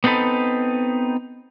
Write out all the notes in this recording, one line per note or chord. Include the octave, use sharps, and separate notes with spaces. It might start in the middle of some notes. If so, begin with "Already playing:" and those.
B3 C4 D#4 A4 B4